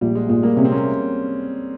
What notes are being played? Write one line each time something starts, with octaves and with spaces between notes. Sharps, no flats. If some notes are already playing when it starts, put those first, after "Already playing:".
A#1 G3
G#3
A#2 G#3
G3 A#3
C3 C#4
C4
A#3 C#4